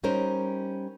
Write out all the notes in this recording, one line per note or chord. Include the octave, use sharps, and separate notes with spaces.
G3 C#4 D#4 A#4 C5